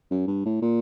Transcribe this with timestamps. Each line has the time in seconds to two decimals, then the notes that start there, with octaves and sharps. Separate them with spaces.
0.11 F#2
0.27 G2
0.45 A2
0.62 A#2